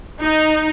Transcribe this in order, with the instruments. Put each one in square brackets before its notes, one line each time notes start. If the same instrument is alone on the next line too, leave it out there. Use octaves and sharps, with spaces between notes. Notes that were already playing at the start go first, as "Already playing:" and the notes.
[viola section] D#4